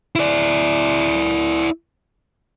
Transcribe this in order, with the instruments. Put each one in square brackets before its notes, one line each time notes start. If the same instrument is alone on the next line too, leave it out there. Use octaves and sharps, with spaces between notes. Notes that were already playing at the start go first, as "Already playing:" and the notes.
[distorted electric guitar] E4 D5